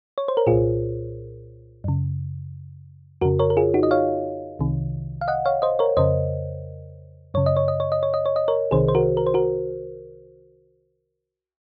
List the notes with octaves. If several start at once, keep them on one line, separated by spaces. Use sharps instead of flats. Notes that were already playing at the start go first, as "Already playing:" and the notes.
C#5
C5
A#4
C2 A#2 F4 G#4
F#2 C#3
F2 C#3 F#4 A#4
A#4 C#5
A#4
F4 G#4
D#4 F#4
D#5
C#5 F5
C2 C3 D#3
F5
D#5 F#5
C#5 F5
C5 D#5
A#4 C#5
F2 C#3 C5 D#5
F#2 C#3 C#5
D#5
C#5
D#5
C#5
D#5
C#5
D#5
C#5
D#5
A#4 C#5
C2 C3 D#3 G#4 C5
C5
F#4 A#4
A#4
C5
F#4 A#4